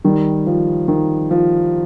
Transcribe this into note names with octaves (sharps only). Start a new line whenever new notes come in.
D#3 G3
F3
D#3
F3